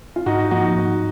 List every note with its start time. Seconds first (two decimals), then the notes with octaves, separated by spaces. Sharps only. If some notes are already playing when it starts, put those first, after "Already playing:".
0.16 F4
0.26 G#2 D#4 F#4
0.51 F3 A#3 D#4 F#4
0.76 G#2